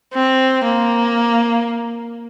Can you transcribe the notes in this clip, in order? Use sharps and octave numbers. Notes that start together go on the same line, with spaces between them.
C4
A#3